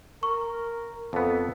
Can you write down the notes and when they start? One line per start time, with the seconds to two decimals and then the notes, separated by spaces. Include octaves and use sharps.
0.23 A#4 C#6
1.13 F2 B3 A4